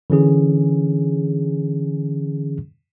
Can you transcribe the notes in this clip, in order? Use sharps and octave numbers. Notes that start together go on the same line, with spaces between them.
D3 E3 C#4 G#4